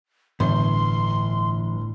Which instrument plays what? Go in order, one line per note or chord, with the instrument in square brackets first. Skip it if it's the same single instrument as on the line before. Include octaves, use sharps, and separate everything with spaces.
[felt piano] G1 [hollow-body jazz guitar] A2 [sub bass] E3 [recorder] C6